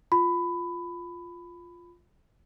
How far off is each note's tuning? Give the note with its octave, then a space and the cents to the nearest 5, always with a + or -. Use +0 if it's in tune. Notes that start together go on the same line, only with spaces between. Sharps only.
F4 +0 B5 +15